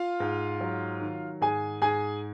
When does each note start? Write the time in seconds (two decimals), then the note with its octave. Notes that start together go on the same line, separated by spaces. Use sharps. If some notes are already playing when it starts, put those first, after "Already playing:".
Already playing: F4 F5
0.20 G#2
0.60 F#3
1.02 D#3
1.41 G#2 G#4 G#5
1.82 G#2 G#4 G#5